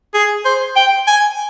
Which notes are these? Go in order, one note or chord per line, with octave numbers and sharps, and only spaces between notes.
G#4
C5
G5
G#5